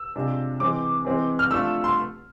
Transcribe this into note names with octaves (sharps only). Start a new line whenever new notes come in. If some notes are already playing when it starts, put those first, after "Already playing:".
Already playing: E6
C3 G#3 D4 F4
E3 G#3 C4 D6
E3 G#3 C4
F6
F3 A3 D4 F4 E6
C6